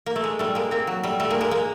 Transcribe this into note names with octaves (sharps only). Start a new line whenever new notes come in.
A#3
A3
G#3
G3 A3
G#3 A#3
A#3 C4
F#3
G3 A3
G3 A3
G#3 A#3
G#3 A#3
G#3 A#3